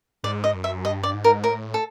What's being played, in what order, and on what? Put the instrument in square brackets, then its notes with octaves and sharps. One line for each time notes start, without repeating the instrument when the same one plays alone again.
[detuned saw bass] G#2 [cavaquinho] D5
[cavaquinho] D#5
[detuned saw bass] F#2
[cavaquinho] E5
[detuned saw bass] G2 [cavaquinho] D#5
[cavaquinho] D5
[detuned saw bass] G#2
[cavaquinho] A#4
[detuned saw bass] A2 [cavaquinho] A#4
[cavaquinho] A4